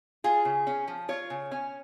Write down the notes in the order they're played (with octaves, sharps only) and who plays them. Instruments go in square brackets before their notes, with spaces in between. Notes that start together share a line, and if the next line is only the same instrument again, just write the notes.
[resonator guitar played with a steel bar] F4 G#4
C#3
C#4
F3
F4 C#5
C#3
C#4